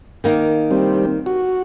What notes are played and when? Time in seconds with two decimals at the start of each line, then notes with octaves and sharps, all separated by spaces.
0.24 D#3 A#3 D#4
0.71 G3 C4
1.26 F#4